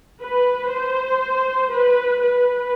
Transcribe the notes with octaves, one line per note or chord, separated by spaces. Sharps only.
B4
C5
B4
B4